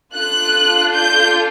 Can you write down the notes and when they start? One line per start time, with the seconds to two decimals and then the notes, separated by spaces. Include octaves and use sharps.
0.13 D4 F4 A4 F#6
0.92 G6